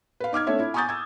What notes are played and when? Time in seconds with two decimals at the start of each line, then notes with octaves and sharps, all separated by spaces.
0.20 B4 F5
0.33 D#4 D6 F6 G#6
0.47 A3 C4 D4 A4 C#5 E5
0.59 E4
0.74 G#5 A#5 C#6 D#6 G6 A6
0.89 E6 G#6